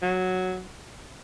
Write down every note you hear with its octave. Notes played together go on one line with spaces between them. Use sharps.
F#3